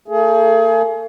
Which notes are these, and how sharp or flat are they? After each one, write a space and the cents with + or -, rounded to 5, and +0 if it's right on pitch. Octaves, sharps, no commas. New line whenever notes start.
A3 +45 G#4 +30